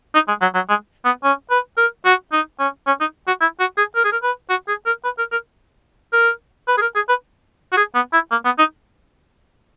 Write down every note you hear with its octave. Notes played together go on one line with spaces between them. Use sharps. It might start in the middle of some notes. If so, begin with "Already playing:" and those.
D#4
G#3
F#3
F#3
G#3
B3
C#4
B4
A#4
F#4
D#4
C#4
C#4
D#4
F#4
E4
F#4
G#4
A#4
G#4
A#4
B4
F#4
G#4
A#4
B4
A#4
A#4
A#4
B4
G#4
A#4
G#4
B4
F#4
G#4
B3
E4
A#3
B3
D#4